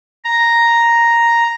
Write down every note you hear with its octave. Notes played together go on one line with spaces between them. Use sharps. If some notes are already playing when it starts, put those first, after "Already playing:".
A#5